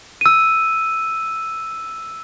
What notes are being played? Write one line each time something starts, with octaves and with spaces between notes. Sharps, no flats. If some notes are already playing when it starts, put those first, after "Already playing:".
E6 D#7